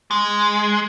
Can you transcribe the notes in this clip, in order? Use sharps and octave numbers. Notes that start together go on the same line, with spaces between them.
G#3